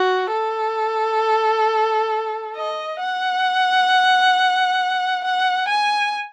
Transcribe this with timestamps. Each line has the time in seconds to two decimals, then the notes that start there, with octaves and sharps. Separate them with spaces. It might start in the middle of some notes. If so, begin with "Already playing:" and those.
Already playing: F#4
0.32 A4
2.56 D#5
3.00 F#5
5.25 F#5
5.68 G#5